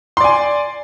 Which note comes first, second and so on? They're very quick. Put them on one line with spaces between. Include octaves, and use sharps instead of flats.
C6 D5 G#5